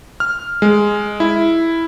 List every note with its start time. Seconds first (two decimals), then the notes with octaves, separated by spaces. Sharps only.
0.20 F6
0.62 G#3
1.20 E4